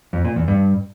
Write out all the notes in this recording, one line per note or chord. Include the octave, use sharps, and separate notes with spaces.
F2
A#2
E2
G2